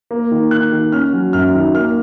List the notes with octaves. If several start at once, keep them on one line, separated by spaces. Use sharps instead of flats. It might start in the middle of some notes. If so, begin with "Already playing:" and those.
A#3
D#3
D#3 F#6
D#3
C#4 F6
F#3
F#2 F6
D#3
A#3 F6